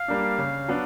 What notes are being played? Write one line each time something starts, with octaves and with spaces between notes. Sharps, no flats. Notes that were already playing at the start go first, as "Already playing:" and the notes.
Already playing: F5
G3 A#3 D4
C#3
F#3 B3 D4